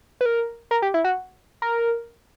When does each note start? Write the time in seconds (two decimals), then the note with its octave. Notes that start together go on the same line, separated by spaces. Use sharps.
0.21 B4
0.26 A#4
0.71 A#4
0.82 G4
0.94 E4
1.04 F#4
1.62 A#4